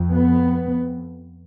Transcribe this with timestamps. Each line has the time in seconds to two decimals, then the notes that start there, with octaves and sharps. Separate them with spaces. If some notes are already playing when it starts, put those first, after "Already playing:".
Already playing: F2
0.12 B3